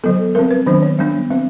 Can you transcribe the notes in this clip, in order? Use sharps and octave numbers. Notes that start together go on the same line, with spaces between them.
D3 F#3 B3 A4
G3 C4 A#4
B4
D#3 F#3 B3 D4 C5
C#5
G3 B3 D4
G3 C4